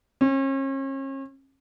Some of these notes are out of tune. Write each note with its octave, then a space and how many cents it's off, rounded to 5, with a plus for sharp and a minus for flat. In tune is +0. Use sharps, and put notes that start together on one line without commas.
C#4 -40